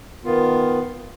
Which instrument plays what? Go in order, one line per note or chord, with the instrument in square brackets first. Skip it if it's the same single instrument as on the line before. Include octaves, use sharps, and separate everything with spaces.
[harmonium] D#3 B3 F4